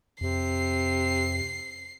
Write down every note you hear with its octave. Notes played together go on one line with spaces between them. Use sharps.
F2 C3 C7